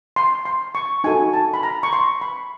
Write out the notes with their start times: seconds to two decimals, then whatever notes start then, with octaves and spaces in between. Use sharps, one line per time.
0.16 C6
0.45 C6
0.75 C#6
1.04 D#4 F#4 A4 G#5
1.33 A5
1.54 B5
1.63 A#5
1.83 C#6
1.93 C6
2.21 B5